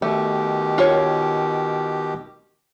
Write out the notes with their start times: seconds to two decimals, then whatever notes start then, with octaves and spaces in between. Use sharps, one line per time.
0.02 B2 D#3 A3 G4
0.78 F4 A#4 C#5